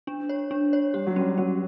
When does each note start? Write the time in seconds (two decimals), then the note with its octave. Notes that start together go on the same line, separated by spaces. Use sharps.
0.07 D4
0.29 C#5
0.51 D4
0.73 C#5
0.94 G3 G4
1.07 F#3
1.16 G3 C#4
1.38 F#3 C#4